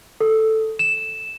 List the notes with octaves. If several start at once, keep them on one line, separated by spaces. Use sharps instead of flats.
A4
E7